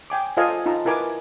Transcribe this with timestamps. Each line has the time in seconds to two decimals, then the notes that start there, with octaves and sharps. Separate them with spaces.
0.10 G5 G#5 D6
0.37 F4 A4 C5 D#5 F5 G#5
0.66 D#4 F4 A5 A#5
0.85 E4 A#4 B4 G#5 D6